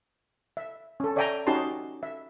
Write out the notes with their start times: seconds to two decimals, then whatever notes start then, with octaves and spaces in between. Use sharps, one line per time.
0.57 E5
1.00 C#4 A4
1.16 C#5 D5 E5 G5 G#5 A#5
1.47 C#4 D#4 F#4 G4 A5 C6
2.03 E5